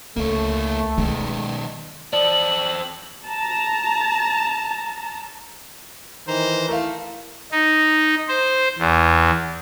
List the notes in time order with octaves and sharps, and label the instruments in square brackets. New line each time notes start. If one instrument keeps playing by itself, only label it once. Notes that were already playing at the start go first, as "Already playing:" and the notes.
[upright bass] C#2 [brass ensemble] A3 [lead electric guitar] A#3 C#5
[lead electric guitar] B2 D#3 [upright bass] G#3
[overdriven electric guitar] C4 A4 [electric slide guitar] D5 [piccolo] F#7
[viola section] A5 A#5
[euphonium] D#3 [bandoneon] E3 A#5 [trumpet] C5
[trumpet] A3 [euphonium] E4 [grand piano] A#4 F5
[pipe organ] D#4
C5
E2